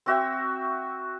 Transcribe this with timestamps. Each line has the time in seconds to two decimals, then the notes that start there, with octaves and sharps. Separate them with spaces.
0.06 C4 F#4 E5 G5